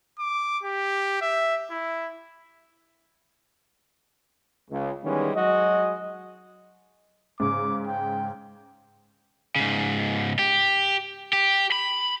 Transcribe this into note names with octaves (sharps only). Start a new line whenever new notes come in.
D6
G4
E5
E4
C#2
D#3 E3 G3 G#3 B3 C#4
F#3 G#3 F#4 D#5
G#2 C#3 D6
G5
G#2 C#3
G4
G4
B5